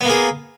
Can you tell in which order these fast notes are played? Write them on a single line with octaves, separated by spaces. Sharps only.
B3 A#3 G#4